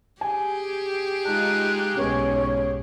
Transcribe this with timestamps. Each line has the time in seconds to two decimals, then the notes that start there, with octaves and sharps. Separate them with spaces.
0.21 G4 G#4 G#5
1.25 G#3 D#4 F4 A5 F#6
1.97 B1 G#2 G#3 B3 C#4 C#5